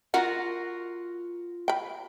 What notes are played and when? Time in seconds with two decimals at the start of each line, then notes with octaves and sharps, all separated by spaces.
0.14 F4 F#4 A#4 F#5
1.68 G5 B5